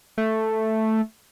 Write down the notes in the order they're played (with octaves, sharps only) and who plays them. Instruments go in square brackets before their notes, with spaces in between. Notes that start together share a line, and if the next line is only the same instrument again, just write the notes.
[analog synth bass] A3